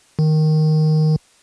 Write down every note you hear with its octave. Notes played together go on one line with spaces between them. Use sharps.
D#3